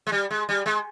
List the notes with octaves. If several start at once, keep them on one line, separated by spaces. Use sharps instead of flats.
G#3
G3
G#3
G3
G#3